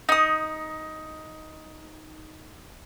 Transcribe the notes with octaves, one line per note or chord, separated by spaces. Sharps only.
D#4 D#6